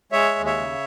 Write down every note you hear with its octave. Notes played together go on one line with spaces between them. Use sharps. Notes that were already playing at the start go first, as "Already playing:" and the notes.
G#3 C#5 E5
D#2
C#5 E5
C#3